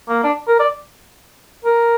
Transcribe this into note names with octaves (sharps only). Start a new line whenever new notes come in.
A#3
D4
A#4
D5
A#4